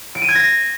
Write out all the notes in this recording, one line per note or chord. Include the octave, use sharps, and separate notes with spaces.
D7
D#7
G#6
A#6